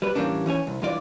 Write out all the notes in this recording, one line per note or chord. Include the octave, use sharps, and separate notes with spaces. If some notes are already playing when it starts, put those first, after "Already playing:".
G3 B4
A2 E3 G3 A#3 C#4 D4
E3 C#4 C#5 G#5
C2
G2 E3 F4 D5